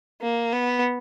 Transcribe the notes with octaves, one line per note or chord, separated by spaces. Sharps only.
A#3
B3